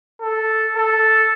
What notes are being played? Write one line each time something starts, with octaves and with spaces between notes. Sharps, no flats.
A4
A4